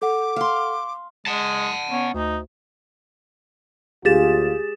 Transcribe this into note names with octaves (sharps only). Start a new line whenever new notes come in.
A4 F#5 D6
F5 C6
G#3 F#5 A5
B3 C#4
D2 D#4
D2 F4 G4 G#4 A6 E7